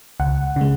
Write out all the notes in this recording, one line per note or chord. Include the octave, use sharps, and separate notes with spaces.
C#2 F#5
C#3 G#3